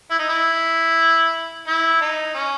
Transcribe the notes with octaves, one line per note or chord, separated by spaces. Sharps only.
E4
D#4
E4
E4
D#4
C#4